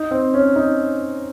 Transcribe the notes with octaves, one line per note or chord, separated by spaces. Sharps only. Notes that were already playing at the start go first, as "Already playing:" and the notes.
Already playing: D#4
C4
C#4
D#4